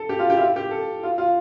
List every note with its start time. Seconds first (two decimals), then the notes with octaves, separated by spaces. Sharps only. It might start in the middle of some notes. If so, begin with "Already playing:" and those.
Already playing: A4
0.09 G4
0.19 F4
0.30 G4
0.37 E4
0.40 F4
0.56 G4
0.71 A4
1.03 F4
1.18 F4